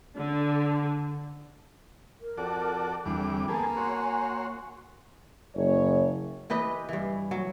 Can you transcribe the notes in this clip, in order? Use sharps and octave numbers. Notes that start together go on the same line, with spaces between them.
D3
A#4
F2 F#4 A4 D5
E2 D3 G3 C4 D6
A#3 B3 G#4 A4 G#5
F#4 C#5 C6
F#1 C#5
E3 G4 B4 D#5
G2 E3
F#3